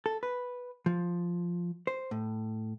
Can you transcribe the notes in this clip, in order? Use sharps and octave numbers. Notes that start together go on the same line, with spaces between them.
A4
B4
F3
C5
A2